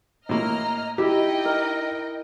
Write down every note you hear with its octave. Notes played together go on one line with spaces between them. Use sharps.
A2 A#3 D#5 A#5 F6
D#4 E4 G4 D#5 G5
A#4